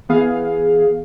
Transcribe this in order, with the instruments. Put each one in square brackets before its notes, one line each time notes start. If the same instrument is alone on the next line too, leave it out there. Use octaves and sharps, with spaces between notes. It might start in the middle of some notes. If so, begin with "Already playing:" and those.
[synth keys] E3 B3 G#4 F5